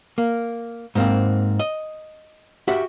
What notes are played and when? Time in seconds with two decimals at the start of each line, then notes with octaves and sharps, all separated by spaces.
0.18 A#3
0.95 G#2 A#3 C4
1.60 D#5
2.68 F#4 G4 E5 F#5